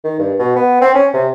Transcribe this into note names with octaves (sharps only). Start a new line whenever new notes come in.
D#3
G2
B2
B3
C4
C#4
C3